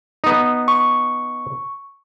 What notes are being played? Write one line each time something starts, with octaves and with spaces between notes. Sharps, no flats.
B3 D#4
C#6